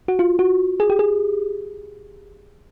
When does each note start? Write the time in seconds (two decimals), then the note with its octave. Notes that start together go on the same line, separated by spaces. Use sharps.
0.08 F#4
0.19 F4
0.39 F#4
0.80 G#4
0.90 G4
0.99 G#4